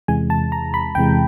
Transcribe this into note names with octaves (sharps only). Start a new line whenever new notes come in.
E2 C3 E3 G#3 G#5
A5
A#5
B5
E2 C3 E3 G#3 G5